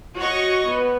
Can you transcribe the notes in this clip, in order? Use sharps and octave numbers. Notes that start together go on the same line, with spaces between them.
F#4 C#5 D#5 C#6
B3